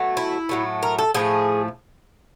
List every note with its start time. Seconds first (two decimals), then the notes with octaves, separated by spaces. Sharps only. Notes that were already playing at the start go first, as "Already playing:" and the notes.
Already playing: B2 F#3 A3
0.17 E4
0.49 A2 F#3 A3
0.83 A#4
0.99 A4
1.14 A2 F3 A3 G#4